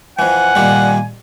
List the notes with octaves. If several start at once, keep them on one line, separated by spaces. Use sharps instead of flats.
F2 E3 F#5 G#5
A#2 D#3 G3